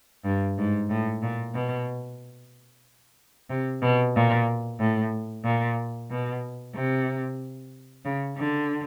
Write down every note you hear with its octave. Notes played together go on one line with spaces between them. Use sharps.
G2
G#2
A2
A#2
B2
C3
B2
A#2
A2
A#2
B2
C3
C#3
D3